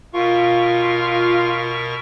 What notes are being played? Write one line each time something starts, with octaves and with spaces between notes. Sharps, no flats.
B2 F4 A#4 C#6